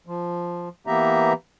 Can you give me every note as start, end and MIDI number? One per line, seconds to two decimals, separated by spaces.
0.07 0.69 53
0.87 1.33 52
0.87 1.33 58
0.87 1.33 59
0.87 1.33 67
0.87 1.33 76
0.87 1.33 82